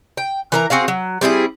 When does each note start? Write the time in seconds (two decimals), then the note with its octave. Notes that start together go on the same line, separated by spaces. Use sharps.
0.17 G5
0.52 E3 A#4 A#5
0.70 C4 F#4 G#4 F5
0.88 F#3
1.21 G3 C4 E4 G#4